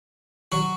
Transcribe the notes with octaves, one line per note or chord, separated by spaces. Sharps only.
F#3 F#4